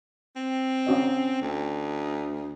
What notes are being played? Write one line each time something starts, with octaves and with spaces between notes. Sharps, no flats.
C4
C#4 F#4 D#5
D2